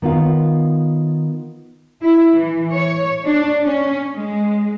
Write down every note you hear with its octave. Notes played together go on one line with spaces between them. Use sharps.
D#3 B3 F4 F5
E4
E3
C#5
D4
C#4
G#3